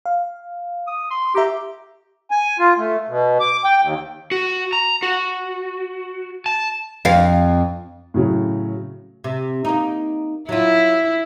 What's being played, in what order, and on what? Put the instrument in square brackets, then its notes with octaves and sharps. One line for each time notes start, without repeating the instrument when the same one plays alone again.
[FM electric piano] F5
[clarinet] D#6
C6
[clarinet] G4 [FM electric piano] E5 A#5 D6
[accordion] G#5
F4
A3
B2
D6
G5
D#2
[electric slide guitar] F#4
A#5
F#4
A5
[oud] F2 F5
[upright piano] A2 C#3 F#3
[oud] C3
A#3 D#4
[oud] F#3 F4 [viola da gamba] E4